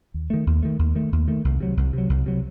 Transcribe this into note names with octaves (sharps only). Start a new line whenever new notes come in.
D#2
D#3 A3
D#2
D#3 A3
D#2
D#3 A3
D#2
D#3 A3
C2
C3 F#3
C2
C3 F#3
C2
C3 F#3